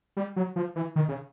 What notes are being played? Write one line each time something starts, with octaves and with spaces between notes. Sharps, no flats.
G3
F#3
F3
E3
D#3
C#3